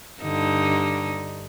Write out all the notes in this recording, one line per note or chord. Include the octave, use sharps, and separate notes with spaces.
G2 D3 D#4